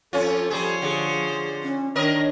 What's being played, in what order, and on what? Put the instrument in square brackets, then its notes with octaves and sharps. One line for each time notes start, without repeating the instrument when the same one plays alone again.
[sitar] F2 C#4 F4 [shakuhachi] A4
[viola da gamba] F3 C5 C#5 [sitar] G3 G#4
[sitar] D3 [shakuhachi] G#4
[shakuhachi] C#4
[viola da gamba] D#3 D4 [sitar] A#4 D#5 [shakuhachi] C#5